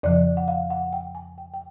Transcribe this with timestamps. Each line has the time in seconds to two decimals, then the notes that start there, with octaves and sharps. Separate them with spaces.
0.03 F2 C#3 F3 D5
0.37 F#5
0.48 F5
0.70 F#5
0.93 G5
1.15 G#5
1.38 G5
1.54 G5